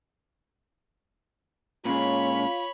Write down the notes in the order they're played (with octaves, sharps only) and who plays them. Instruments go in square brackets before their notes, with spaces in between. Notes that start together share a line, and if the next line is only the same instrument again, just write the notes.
[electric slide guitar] A#2 G#3 [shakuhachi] C#4 [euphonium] F4 [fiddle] C#5 B5